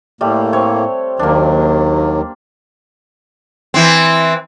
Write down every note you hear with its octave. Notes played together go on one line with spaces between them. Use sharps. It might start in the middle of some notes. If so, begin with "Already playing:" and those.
A2 G3 A3 A#3
C4 C#5
D#2 D#3 F#3 A#3 D4
E3 C4